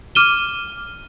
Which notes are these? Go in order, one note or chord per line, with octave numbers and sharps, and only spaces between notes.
D6 F6 D#7 E7 G7